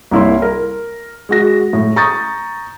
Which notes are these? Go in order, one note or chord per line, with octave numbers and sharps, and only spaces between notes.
C2 A#3 E4 C#5 C6
A#4
G#3 F#4 A#6
A2
A#5 C#6 D#6 G6 A6